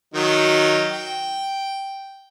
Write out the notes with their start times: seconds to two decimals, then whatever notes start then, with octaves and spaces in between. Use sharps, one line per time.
0.14 D#3 F#3 D#4
0.92 G5